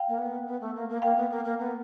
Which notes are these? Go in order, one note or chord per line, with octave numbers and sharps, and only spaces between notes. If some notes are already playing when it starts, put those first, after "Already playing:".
Already playing: F5 G5
A#3
B3
B3
A3
A#3
A#3
A#3 F5 G5
B3
A#3
A#3
B3